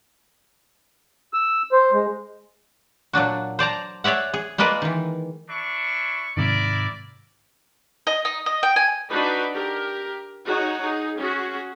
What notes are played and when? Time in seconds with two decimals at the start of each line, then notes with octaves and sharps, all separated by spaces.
1.33 E6
1.72 C5
1.93 G#3
3.13 A#2 F#3 D4 F#4
3.59 C5 D5 A5 A#5
4.04 G#4 C#5 D5 E5 F#5
4.34 G#4
4.58 G#3 A#3 F4 B4 D5 D#5
4.82 D#3 E3
5.49 D4 E4 C#6
6.37 G#2 C3 D#3 E4 A#4 D5
8.07 D#5
8.25 D#4
8.46 D#5
8.63 G5
8.76 G#5
9.11 D4 D#4 F#4 B4
9.55 G4 A#4
10.46 D#4 F#4 G#4 C#5
10.81 D#4 G#4
11.18 C#4 F#4 G#4